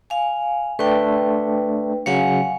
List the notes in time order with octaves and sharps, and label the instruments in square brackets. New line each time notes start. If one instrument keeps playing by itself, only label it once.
[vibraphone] F5 G#5
[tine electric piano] A3 D4 [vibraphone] B4 G5
[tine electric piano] C#3 F#3 C#7 [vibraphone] F5 F#5 G#5